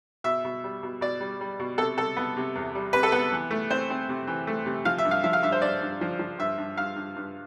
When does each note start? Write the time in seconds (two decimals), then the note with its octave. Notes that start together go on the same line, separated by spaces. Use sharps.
0.24 B2 E5
0.45 B2
0.64 G3
0.83 B2
1.01 B2 D5
1.20 G3
1.41 G3
1.60 B2
1.78 C3 A4
1.97 C3 A4
2.16 B3
2.37 C3
2.55 E2
2.75 G3
2.93 C3 B4
3.03 A4
3.12 B3 B4
3.32 E3
3.51 A3
3.70 C4 C5
3.90 C4
4.09 C3
4.27 E3
4.47 A3
4.66 C3
4.85 F3 F5
4.98 E5
5.05 G2
5.11 F5
5.23 F3 E5
5.33 F5
5.42 G2 E5
5.52 C5
5.62 G2 D5
5.82 G2
6.01 F3
6.19 F3
6.39 G2 E5
6.58 G2
6.77 G2 F5
6.96 G2
7.16 G2